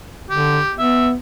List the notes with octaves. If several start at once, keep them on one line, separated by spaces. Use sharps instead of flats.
D3 G4
B3 E5